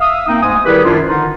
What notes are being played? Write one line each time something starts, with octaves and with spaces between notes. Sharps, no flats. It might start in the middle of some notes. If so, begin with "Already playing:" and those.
E5 F5 D#6
A#3 C4 D#4
D2 G#2 G#3 G#5 D#6
D#3 G3 E4 G4 G#4 B4
F#2 D#3 F3 D4 E4 F4
D3 D#3 D#4 F4